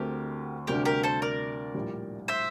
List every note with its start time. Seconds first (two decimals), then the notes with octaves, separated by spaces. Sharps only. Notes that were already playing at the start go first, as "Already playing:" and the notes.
Already playing: D2 D3 A3 C4 G4 A#4
0.67 D2 C3 G3 D4 G4 A#4
0.85 G4 A#4
1.03 A4 C5
1.22 A#4 D5
1.74 A#1 A2 G3
2.28 C5 E5